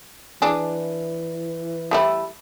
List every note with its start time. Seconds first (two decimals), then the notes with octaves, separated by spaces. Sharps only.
0.42 E3 D4 G#4
1.91 G3 A3 E4